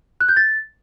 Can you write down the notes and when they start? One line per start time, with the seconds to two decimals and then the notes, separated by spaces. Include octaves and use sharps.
0.21 F#6
0.29 G6
0.37 A6